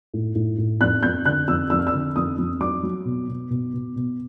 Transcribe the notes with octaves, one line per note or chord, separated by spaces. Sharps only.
A2
A2
A2
F2 F#6
F2 G6
D3 F#6
F2 E6
F2 E6
F6
E6
D3
F2 D#6
F2
F#3 D6
F#3
B2
B2
B2
B2
B2